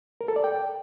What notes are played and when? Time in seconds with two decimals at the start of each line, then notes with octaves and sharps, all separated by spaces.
0.21 A#4
0.28 A4
0.36 D5
0.44 G5